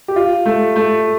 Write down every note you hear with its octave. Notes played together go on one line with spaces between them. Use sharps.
G4
F4
A3
A3